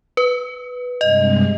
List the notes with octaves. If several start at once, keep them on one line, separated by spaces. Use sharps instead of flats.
B4
G2 C3 G#3 D#5